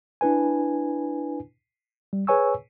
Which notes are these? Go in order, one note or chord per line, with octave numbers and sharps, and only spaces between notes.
D4 E4 B4 G#5
G3
G#4 B4 C#5 G#5 C#6 E6